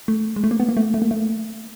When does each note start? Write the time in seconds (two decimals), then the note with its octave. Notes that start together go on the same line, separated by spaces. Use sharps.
0.08 A3
0.36 G#3
0.44 A3
0.51 A#3
0.60 B3
0.69 A#3
0.77 A3
0.94 A3
1.02 A#3
1.11 A3